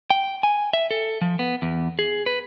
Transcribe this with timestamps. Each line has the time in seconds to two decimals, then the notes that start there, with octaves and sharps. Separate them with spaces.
0.10 G5
0.43 G#5
0.73 E5
0.91 A4
1.21 F3
1.39 B3
1.62 E2
1.99 G#4
2.26 B4